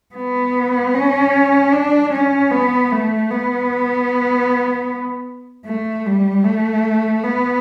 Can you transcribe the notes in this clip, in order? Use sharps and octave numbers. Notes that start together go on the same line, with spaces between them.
B3
C#4
D4
C#4
B3
A3
B3
A3
G3
A3
B3